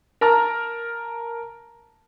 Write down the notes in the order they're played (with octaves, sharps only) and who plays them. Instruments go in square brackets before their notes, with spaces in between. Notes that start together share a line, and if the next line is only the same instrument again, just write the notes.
[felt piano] A#4 A5 A#5 F6